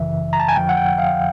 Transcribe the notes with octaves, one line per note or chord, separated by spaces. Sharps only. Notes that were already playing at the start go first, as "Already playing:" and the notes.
Already playing: G#1 F#2 C#3 E3 E5
A#5
A5
G#5
F2 D3 F3 G5
F#5
G5
F5